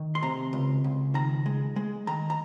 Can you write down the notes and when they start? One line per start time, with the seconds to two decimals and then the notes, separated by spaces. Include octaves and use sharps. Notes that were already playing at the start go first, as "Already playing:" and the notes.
Already playing: D#3
0.15 C6
0.22 C3 A#5
0.53 C#2
0.84 C#2
1.14 D#3 A#5
1.46 G#3
1.76 G#3
2.07 D#3 A#5
2.30 A#5